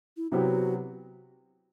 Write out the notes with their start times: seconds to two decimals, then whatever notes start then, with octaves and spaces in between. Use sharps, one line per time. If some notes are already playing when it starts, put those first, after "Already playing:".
0.17 E4
0.32 C3 F#3 B3 E4 F#4 G4